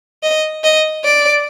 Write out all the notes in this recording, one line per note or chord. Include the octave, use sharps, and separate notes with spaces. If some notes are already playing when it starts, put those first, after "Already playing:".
D#5
D#5
D5